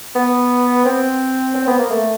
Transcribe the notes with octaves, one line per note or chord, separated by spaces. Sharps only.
B3
C4
C4
B3
A#3
A3